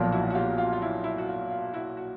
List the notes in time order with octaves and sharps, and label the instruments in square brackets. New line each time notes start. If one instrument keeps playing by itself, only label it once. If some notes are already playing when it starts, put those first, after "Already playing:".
Already playing: [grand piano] B1 A#2 F3 [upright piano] F4
[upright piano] E4 F#4
F#4
F4 G4
F4
F4
E4
E4
F#4
F4
F4
E4 F#4
F#4